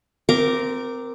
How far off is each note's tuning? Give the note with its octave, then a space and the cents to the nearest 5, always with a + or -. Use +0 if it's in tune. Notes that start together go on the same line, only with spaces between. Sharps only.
C4 -25 A#4 +0 D6 +0